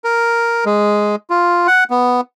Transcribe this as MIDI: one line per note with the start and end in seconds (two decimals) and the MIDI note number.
0.04 0.65 70
0.66 1.16 56
1.30 1.67 65
1.67 1.84 78
1.90 2.21 59